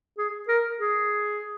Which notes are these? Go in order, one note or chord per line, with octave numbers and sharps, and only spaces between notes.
G#4
A#4
G#4